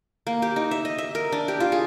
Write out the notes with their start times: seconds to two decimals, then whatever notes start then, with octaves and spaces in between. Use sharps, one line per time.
0.27 A#3
0.42 G4
0.56 D#4
0.71 E5
0.85 D#5
0.98 E5
1.15 A#4
1.32 D4
1.48 G4
1.60 F4
1.72 G#4